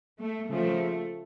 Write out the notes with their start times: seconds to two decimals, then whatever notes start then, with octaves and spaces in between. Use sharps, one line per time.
0.19 A3
0.49 C#3 F3 A3